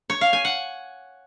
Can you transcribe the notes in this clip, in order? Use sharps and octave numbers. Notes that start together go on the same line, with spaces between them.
C#5
F5
G#5
F#5